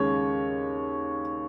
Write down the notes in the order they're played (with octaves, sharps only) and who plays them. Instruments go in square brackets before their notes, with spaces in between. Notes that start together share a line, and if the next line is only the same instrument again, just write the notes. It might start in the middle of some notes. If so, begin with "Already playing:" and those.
Already playing: [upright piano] D#2 C#3 G#3 C#5